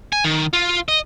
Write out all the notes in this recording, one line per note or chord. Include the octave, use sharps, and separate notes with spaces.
G#5
D#3
F4
D#5